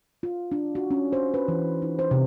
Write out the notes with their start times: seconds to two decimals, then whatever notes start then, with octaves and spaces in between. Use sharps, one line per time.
0.23 F4
0.52 D4
0.75 F#4
0.91 C#4
1.13 C5
1.34 B4
1.48 E3
1.82 D#4
1.99 C5
2.11 C3